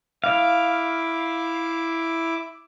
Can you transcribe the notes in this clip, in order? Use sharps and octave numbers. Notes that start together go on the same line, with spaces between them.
E4 F5 D6